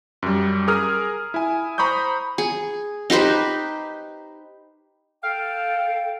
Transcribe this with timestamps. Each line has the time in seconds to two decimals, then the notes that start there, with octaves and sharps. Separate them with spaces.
0.23 F#2 G3
0.68 G#4 A#4 D#6 F6
1.34 E4 G#5
1.78 C5 A#5 B5 C#6 D#6 G6
2.38 G#4
3.10 D#4 G4 B4 C5
5.23 A4 F5 G5